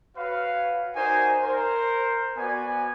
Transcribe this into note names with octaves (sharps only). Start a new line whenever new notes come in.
F#4 B4 C#5 F5
D#4 F#4 A#4 C5 D5 G#5
A#4 C5
B3 F#4 D5 G#5